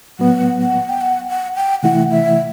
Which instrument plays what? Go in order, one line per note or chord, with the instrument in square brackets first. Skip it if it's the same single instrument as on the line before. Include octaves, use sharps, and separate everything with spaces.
[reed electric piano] A2 F#3 B3 [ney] F#5
[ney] F#5
G5
F#5
F#5
G5
[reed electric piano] C3 E3 A3 E4 [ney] F#5
[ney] E5